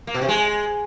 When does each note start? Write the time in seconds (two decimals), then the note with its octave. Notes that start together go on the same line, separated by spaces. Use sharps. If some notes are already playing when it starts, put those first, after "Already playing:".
0.07 A#3
0.14 B2
0.21 C3
0.28 G#3